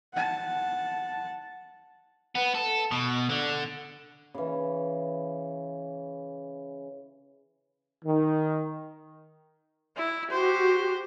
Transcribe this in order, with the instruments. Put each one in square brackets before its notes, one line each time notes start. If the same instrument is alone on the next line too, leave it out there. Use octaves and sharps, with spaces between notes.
[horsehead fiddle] F#5 A5
[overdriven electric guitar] B3
A4
B2
D3
[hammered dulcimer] C#3 E3
[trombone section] D#3
[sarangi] E4
[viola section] F#4 G4 [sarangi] C5